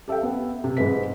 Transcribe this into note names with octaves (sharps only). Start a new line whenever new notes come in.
G4 A4 E5 F5 G5
B3
C3
G#2 G#3 C4 B4 B6